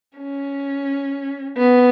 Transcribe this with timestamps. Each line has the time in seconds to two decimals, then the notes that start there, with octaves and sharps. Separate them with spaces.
0.18 C#4
1.57 B3